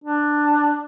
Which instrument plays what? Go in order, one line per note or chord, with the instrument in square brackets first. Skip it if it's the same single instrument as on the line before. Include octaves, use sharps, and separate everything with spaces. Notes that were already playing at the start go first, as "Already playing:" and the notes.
[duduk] D4